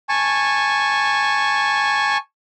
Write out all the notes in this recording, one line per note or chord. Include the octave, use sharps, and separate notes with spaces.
G#5 A5 C#6